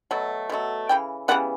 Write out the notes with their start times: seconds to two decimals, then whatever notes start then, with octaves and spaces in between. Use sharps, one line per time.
0.11 B2 F#3 A3
0.49 B2 F#3 A3
0.89 C#3 E3 G5
1.28 C#3 E3 G3 B3 F#5